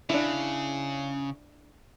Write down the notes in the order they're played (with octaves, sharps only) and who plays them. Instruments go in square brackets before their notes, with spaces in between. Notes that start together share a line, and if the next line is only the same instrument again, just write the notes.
[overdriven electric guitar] C#3 [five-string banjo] D4 E4